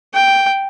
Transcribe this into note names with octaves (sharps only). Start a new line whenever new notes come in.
G5